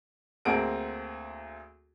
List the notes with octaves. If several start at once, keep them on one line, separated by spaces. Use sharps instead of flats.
D2 A#3 C4 G#4 F#5 D7